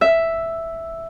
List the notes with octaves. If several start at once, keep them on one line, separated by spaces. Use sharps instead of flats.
E5